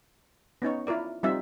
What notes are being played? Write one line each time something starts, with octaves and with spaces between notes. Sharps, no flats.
B3 C#4 D#4 C#5
E4 F4 A#4 D5
G3 C4 D#4 F4 E5